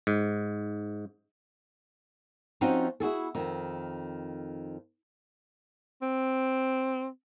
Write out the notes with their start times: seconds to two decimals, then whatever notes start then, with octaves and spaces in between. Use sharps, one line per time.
0.07 G#2
2.61 F3 C4 C#4 D#4 F#4
3.00 E4 F#4 G#4 A4
3.35 F2 D#3
6.02 C4